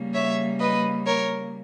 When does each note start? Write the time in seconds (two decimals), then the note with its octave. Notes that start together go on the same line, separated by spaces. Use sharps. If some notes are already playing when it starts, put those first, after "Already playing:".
Already playing: C#3 G3 A#3
0.14 C#5 E5
0.60 B4 D#5
1.06 A#4 C#5